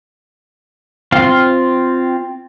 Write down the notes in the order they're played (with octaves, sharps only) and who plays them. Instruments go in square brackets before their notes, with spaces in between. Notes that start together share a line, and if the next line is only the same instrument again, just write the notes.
[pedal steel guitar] C4 F4 F5